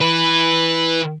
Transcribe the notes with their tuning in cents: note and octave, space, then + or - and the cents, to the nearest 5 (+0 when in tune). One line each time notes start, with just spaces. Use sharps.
E3 +0 B4 +0